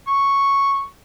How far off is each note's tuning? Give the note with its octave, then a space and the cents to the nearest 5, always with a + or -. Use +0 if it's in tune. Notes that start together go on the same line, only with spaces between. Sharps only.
C#6 -5